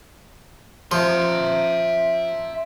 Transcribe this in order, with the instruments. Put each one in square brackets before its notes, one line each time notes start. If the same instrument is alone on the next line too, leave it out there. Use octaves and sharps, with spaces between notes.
[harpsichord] F3 [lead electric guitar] E5 C6